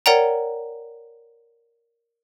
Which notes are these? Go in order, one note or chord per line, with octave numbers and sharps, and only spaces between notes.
A#4 C#5 D5 F#5 G5 A#5